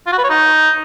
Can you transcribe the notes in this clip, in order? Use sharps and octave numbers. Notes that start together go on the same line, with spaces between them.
F4
F#4
B4
C#5
D#4